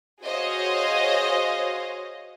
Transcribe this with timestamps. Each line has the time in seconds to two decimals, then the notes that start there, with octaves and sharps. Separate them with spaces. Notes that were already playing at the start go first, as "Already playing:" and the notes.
0.22 F#4 G#4 C5 C#5 D#5 F5